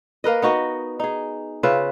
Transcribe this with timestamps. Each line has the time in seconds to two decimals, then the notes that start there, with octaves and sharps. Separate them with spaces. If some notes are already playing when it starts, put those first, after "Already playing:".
0.24 A#3 A#4 B4 D#5
0.42 B3 D#4 F#4 D#5
1.00 D#4 G#4
1.63 C#3 F4 B4 E5